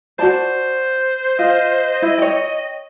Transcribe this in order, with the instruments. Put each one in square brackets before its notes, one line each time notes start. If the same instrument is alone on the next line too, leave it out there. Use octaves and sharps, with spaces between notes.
[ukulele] F#4 D5 A5 [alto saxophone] C5
[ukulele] F4 [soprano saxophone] D#5
[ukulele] E4
C#5 G5